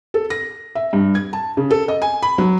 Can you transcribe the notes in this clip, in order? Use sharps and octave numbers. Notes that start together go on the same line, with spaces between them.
A4
A#6
E5
G2
G#6
A5
C#3
A4
D#5
G#5
B5
F#3